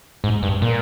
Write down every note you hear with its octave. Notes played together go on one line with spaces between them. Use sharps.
G#2
G2
A#2